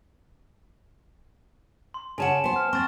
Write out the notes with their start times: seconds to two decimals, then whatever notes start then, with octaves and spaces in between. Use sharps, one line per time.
1.94 C6
2.18 C#3 C#5 F#5 G#5 A5 E7
2.44 B3 C5
2.56 F6
2.73 C4 C#6 A6